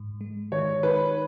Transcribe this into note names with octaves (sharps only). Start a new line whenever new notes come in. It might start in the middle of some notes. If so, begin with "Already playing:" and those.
Already playing: G#2
G#3
D#3 C#5
D#4 B4